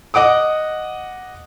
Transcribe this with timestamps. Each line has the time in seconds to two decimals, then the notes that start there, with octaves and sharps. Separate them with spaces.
0.14 D#5 F#5 D6 D#6